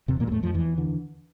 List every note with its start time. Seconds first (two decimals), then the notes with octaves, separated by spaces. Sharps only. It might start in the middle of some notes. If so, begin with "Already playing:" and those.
0.08 E2 C3 C4
0.20 A#2 A#3
0.27 G3
0.31 E2 A2 A3
0.43 F2 F3
0.54 E2 E3
0.78 D3 E3